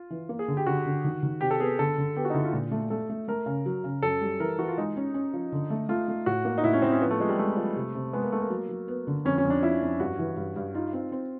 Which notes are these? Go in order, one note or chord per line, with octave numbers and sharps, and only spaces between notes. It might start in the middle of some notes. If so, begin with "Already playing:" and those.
Already playing: F4
E3
A#3
G#4
D3
G4
D3 F#4
D3
D#3
D#3
C3 G4
A4
B3 G#4
D3 A4
D3
B3 G4
F#4
D#4
D3 E4
F4
A#2
A3
A3 A4
A3
A3 A#4
C#3
F#3
C#3
F#2 A4
G3
E3 A#4
E3 F#4
F4
G#3 D#4
C#4
C#4
F3
D3
A3
A3 F4
A3
A2 F#4
A#3
D#4
A2 E4
C#4
A2 C4
C#4
F3 B3
A3
F3 G#3
G3
G#3 A3
F3
C3
C3
G#3 B3
A#3
G#3 A3
A#3
F#3
F#3
B3
D3
F2 C#4
C#4
F2
D4
F3 E4
F2
G2 F#4
E3
G2
G2
D#4 F4
C4
C4